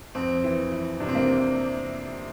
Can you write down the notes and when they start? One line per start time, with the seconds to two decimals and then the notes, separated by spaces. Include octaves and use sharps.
0.15 F2 C4
0.44 E3
0.72 E3
1.00 C3 D4
1.09 C4
1.15 A#3